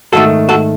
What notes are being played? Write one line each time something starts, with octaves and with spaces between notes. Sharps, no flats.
G#2 D#3 A3 F#4 A4
F#4 A4